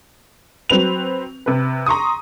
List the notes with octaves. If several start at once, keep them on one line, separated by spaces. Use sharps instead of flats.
F#3 C4 B4 F7
C3 B4
A#5 C6 C#6 D#6